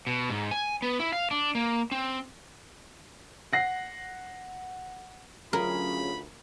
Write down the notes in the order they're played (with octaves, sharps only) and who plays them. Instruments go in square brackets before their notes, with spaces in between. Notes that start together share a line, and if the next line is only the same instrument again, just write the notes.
[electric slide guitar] B2
G#2
G#5
B3
E4
F5
D4
A#3
C4
[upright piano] F#5 A#6 C7
[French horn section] D2 F4 [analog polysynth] F#3 C#4 G#4 [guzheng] A#4 [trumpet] B5